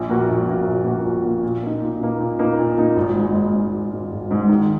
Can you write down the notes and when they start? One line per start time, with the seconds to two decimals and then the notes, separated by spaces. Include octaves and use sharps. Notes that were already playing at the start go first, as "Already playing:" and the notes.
Already playing: A#1
0.09 A#2 A#3 F#4
0.29 A#1
0.47 A#2 A#3 F#4
0.67 A#1
0.85 A#2 A#3 F#4
1.05 A#1
1.24 A#2 A#3 F#4
1.43 A#2
1.63 A#3 D#4
1.82 A#2
2.00 A#3 D#4
2.20 A#2
2.39 A#3 D#4
2.59 A#2
2.78 A#3 D#4
2.96 G#1
3.16 G#2 G#3
3.35 G#1
3.53 G#2 G#3
3.73 G#1
3.92 G#2 G#3
4.11 G#1
4.31 G#2 G#3
4.49 D#3